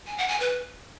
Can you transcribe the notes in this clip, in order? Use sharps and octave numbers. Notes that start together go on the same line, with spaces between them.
G#5
F#5
G#5
B4